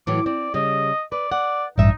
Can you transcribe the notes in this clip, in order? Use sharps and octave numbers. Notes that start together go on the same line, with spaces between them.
A2 E3 F#3 D6
C4 D5
C#3 G3 D#5
B4 D5
D5 F#5
A1 G2 D4 D#4 E5